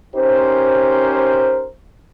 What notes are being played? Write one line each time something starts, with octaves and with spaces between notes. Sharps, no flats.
C#4 D#4 G4 A#4 C5